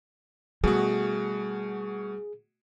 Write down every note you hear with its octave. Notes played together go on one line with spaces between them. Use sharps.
B2 G3 A3 F#4 G#4